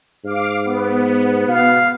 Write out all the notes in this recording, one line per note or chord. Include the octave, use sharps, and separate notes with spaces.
G#2 F5 D6
B3
B2 F5